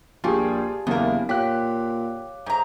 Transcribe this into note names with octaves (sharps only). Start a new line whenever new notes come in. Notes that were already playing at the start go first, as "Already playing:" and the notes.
A#1 G3 F4 G4 G#4 G#5 A5
F#1 E2 A#3 B3
A#2 G4 C#5 F5 D6 F#6 B6
G#2 A#5